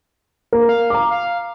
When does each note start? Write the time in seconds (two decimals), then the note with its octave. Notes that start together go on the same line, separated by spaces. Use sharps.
0.52 A#3 A#4
0.69 F5
0.90 A#5 D6
1.10 F5